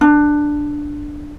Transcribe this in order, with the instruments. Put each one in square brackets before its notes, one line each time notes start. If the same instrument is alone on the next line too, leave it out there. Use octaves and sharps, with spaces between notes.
[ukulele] D4